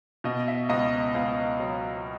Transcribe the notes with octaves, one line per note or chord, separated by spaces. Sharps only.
B2 D#5
E5
C#2 D#5
C#2 F5
F#3